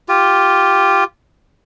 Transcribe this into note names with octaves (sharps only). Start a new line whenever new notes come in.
F4 G4